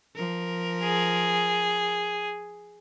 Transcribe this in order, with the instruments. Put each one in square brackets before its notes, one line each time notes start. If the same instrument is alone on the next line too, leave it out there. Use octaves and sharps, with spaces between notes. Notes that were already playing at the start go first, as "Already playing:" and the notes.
[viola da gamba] F3 A#4
[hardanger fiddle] G#4